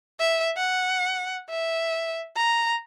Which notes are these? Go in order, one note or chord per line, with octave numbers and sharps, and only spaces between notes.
E5
F#5
E5
A#5